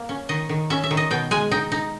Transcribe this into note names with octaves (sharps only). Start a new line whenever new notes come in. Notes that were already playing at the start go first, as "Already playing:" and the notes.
Already playing: A#3
C#4
D#3 D#5
D#3
C#4 E5
E5
D#3
D#5
B2 G5
G#3 G#5
D#4 G5
D#4